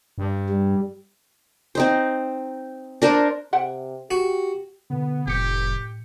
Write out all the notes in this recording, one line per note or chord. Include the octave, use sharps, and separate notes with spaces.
G2
G3
C4 D#4 C5
D4 A#4 C5
C3 E5 F#5 G5
F#4 G4
B2 D3 B3
F1 A2 G4 C#7